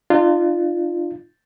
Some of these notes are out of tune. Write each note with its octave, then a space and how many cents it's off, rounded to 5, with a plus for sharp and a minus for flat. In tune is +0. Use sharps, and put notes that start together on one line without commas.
D4 +45 F4 -10